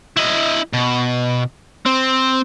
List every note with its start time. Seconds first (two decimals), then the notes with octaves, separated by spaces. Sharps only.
0.17 E4 D#5
0.73 B2
1.86 C4